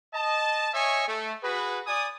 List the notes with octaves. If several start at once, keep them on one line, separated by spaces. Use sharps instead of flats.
D#5 A5
C#5 D#5 E5 G#5 C#6
A3
F#4 G#4 B4
D5 G#5 D#6